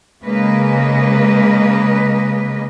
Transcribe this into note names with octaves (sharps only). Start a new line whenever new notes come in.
C#3 G#3 A#3 B4 D#5